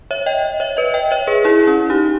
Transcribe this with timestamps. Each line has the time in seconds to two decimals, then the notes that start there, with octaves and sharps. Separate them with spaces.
0.11 C#5 E5
0.26 D#5 G5
0.60 C#5 E5
0.77 B4 D#5
0.94 D#5 G5
1.11 C#5 E5
1.27 G#4 B4
1.44 E4 G#4
1.67 C#4 E4
1.90 D#4 G4